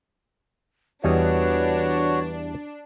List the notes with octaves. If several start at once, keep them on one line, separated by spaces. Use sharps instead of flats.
E2 G3 D4 F#4 B4 C#5 D#5